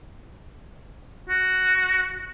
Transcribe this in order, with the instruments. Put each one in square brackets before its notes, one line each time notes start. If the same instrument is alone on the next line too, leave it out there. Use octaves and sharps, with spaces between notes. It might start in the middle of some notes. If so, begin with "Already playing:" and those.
[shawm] F#4